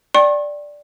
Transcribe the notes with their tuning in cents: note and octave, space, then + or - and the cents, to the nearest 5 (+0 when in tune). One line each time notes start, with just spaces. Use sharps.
D5 +0 G5 +0 C#6 -45